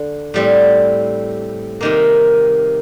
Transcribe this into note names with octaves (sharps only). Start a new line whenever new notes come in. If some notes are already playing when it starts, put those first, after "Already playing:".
Already playing: D3 D4
A2 G3 C4
C3 D#3 A#3